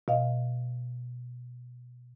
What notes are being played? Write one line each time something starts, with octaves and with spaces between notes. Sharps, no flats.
B2 D#5 F5